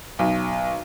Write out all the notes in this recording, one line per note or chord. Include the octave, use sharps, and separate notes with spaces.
B1